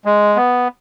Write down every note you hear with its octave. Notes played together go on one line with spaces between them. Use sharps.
G#3
B3